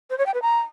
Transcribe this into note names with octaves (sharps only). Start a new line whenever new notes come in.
C5
C#5
G5
B4
A#5